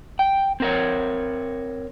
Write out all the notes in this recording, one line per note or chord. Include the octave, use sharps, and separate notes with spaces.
G5
C4 A#4 C#5